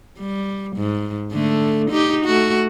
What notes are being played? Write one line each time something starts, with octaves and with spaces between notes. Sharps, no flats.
G3
G#2
D3 A3
D#4 G4
A3 F#4